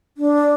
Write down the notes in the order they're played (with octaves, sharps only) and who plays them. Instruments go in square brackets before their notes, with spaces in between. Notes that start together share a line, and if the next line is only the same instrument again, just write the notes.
[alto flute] D4